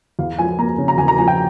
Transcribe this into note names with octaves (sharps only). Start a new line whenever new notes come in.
E2 F5
F3 G#5
A#3 A#5
C#3
A#5
E2 G#5
A#5
F3 G#5
G5